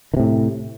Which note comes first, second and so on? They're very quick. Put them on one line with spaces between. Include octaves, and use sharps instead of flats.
D#3 C3 A2